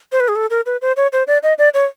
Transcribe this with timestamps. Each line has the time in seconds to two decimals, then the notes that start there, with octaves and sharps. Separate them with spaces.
0.12 C5
0.20 B4
0.28 G#4
0.36 A4
0.50 A#4
0.66 B4
0.82 C5
0.97 C#5
1.13 C5
1.27 D5
1.43 D#5
1.58 D5
1.74 C#5